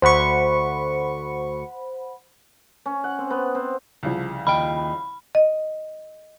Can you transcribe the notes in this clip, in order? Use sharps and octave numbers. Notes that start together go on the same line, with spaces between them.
D2 C5 F#5 B5 C#6
C#4
F#5
C4
B3
C4
C2 C#3 F3
D#2 D#5 G5 B5
D#5